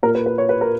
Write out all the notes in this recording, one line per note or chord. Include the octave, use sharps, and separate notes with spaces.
A#2 A#4
B4
B4
C#5
B4
A#4